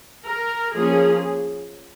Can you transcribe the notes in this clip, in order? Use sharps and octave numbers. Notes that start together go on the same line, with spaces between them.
A#4
F3 A#3 C#4 G#4